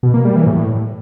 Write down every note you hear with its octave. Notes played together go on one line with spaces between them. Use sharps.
B2
A#3
G3
E3
A2